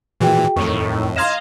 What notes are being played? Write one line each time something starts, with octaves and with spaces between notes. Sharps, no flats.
A#2 E3 F#4 G#4 G5
F2 A2 D#3 C#6
D#5 F5 A#5 C6 G#6 E7